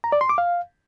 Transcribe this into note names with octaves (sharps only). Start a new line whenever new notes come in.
A#5
D5
C6
D6
F5